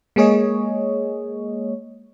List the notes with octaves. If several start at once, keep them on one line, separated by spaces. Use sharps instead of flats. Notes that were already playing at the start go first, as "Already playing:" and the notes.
G#3 A#3 G#4 C#5 D#5